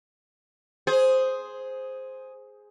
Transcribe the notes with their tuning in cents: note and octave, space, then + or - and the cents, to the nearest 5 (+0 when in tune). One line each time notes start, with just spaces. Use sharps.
G#4 +5 C5 +0